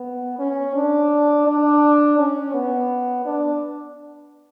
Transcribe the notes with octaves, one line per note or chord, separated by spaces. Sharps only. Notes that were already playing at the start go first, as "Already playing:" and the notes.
Already playing: B3
C#4
D4
D4
C#4
B3
D4